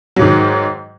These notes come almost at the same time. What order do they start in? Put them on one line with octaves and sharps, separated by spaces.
F#3 G#2 D#3